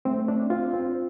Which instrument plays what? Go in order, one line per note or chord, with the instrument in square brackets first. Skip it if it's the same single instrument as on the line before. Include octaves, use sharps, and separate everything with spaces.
[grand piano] A3 [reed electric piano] C4
[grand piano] C4 [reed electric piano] D4
[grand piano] C4 [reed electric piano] F4
[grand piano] C4